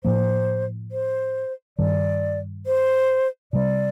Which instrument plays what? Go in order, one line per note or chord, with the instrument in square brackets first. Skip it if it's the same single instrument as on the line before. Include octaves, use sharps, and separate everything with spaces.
[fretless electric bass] A2 F3 A#3 [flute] C5
[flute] C5
[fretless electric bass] G2 D#3 G3 [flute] D5
[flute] C5
[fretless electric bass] C3 G3 C4 [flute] D5